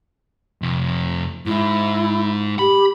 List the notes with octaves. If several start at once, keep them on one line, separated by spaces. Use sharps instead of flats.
F2 C3
G#2 G#3 E4
G4 B5